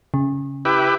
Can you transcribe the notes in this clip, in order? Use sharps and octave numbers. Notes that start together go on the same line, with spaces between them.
C#3
E4 G4 B4